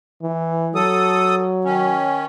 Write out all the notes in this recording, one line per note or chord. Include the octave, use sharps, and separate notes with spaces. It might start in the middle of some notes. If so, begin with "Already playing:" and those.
E3
F#3 A4 D#6
D#3 C#4